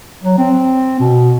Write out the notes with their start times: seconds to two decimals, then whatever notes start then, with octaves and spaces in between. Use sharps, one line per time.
0.24 F#3
0.38 C4
1.00 B2